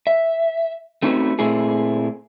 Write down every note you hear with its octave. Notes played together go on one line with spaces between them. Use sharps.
E5
A3 C4 C#4 D#4 F#4 B4
A#2 A3 C4 E4 G#4